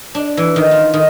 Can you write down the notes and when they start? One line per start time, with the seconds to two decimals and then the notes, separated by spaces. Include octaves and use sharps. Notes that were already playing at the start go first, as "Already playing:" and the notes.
0.15 D4
0.37 E3
0.56 D#3
0.71 F4
0.94 D#3